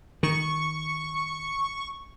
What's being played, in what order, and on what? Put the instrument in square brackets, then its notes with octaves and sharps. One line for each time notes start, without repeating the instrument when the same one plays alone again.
[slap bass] D#3 [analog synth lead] C#6